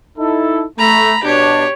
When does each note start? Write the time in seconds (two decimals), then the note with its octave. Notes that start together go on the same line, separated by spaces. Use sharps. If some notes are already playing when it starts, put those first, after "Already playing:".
0.18 D#4 E4 A4
0.79 A3 A#5 B5
1.24 B2 D4 G4 C#5